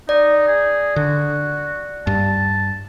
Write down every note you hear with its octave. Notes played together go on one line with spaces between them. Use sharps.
D#4 D5
G#4
D3 F#4
G2 A5